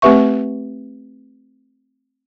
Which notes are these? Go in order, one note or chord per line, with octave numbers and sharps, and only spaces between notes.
A3 C4 G4 B4 E5 C#6